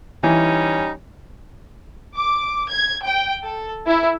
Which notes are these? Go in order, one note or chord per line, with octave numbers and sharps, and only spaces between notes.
E3 G3 C#4 D#4
D6
G#6
G5
A4
E4